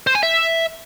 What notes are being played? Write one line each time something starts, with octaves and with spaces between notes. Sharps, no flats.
C5
G#5
E5